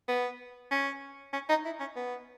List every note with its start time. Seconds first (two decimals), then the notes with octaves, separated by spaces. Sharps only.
0.08 B3
0.71 C#4
1.33 C#4
1.49 D#4
1.65 E4
1.80 C#4
1.96 B3